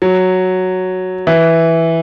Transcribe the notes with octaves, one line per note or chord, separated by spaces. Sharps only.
F#3
E3